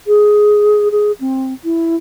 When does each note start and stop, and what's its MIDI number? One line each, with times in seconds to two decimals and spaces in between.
0.07 0.88 68
0.92 1.12 68
1.21 1.53 60
1.64 1.96 64